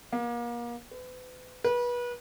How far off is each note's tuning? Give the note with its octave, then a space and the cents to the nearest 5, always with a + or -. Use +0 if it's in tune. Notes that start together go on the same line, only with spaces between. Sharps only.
A#3 +35
B4 +35
B4 -30